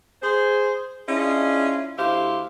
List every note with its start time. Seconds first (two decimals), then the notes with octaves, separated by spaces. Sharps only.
0.22 G#4 C5
1.07 C#4 D4 E4 F4 G#4 D#5
1.97 D2 E4 G4 C5 F5